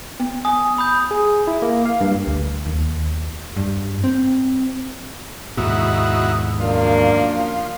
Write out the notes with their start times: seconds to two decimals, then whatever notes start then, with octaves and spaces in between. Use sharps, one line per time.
0.20 B3
0.45 G#5 D#6
0.78 B5 D#6 G6
1.11 G#4
1.47 E4
1.62 A#3
1.86 F5
2.01 G2
2.27 D2
2.66 D#2
3.57 G2
4.04 C4
5.57 D#2 G#2 B2 D#4 E4 F#4
6.61 F#2 F3 A#3 D4